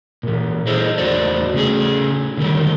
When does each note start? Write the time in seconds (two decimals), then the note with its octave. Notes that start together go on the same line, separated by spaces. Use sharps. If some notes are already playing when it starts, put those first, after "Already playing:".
0.23 A#2 E3
0.67 E4 G#4 A4 C5 D#5 E5
0.98 E2 A2 F#4 C5 D5
1.54 C#3 A3 G#4
2.37 D3 D#3 F#3 G3 A3 G4